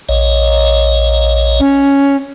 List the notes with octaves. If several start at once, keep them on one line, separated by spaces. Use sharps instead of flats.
A#1 C#5 D#5
C#4